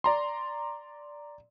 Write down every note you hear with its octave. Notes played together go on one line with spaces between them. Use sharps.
D5 A#5 C6